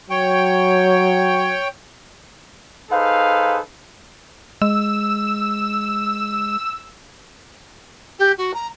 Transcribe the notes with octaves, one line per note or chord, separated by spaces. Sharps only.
F#3 C#5 G5
D#4 G#4 A4 B4 C5 F5
G#3 E6
G4
F#4
A#5